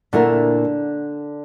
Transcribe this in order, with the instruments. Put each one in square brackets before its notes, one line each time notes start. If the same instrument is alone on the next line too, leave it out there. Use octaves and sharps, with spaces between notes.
[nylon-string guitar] A#2 A3 E4 A#4 [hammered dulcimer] D3